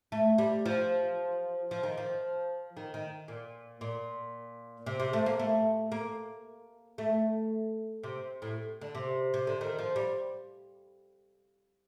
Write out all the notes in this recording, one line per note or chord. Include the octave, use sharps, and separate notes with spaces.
A3
G3
F3
F3
D#3
F3
D#3
D#3
A#2
A#2
C3
C3
A3
A#3
A3
A#3
A3
C3
A2
D3
C3
C3
D3
D#3
F3
G3